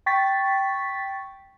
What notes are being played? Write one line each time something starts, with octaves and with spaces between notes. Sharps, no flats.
G5 C#6 A6 B6